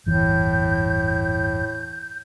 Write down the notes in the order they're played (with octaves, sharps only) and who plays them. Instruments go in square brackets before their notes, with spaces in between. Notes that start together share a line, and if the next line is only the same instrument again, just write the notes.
[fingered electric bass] G1 E2 E3 [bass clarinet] A2 [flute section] G6